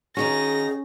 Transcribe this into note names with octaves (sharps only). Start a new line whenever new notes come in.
D#3 C#4 D#4 F#4 G#4 A#6